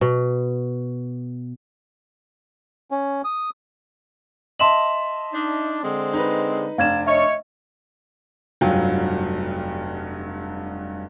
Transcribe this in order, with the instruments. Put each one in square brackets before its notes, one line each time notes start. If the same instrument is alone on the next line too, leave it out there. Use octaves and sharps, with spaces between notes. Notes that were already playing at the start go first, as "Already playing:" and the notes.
[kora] B2
[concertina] C#4
D#6
[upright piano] D#5 E5 A5 [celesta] C6 E7 F#7
[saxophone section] D4 D#4
D3 G#3 C4
[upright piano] D#4 B4
[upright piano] F1 D4 [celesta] F5 G#6 E7
[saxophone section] C#5 [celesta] D#5 E5
[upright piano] F1 G2 F#3 F4 G5